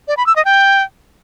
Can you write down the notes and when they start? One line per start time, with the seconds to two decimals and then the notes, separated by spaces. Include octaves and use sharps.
0.08 D5
0.17 B5
0.27 E6
0.36 D#5
0.45 G5